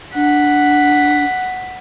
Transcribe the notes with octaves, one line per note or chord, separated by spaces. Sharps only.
D4 F#5 B6